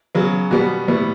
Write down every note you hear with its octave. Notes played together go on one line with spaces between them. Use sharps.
C#3 F#3 B3
B2 G3 B3 F#4
A2 G3 B3